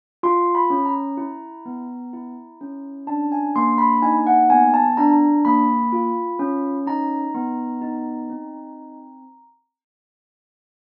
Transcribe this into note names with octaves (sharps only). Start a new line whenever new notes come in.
F4 C6
B5
C#4
A#5
E4
B3
E4
C#4
D4 A5
G#5
A#3 C6
B5
D#4 G#5
F#5
B3 G#5
A5
D4 A#5
A#3 B5
F4
C#4
D#4 A#5
B3
D#4
C4